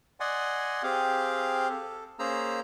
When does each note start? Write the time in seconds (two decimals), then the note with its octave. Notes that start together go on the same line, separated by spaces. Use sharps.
0.20 D5 D#5 F#5 G#5 C6
0.83 C4 G4 G#4 F5
1.69 A4
2.19 A#3 C#4 G#4 C5 A#5 E6